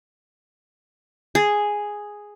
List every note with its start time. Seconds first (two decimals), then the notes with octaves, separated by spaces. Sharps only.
1.35 G#4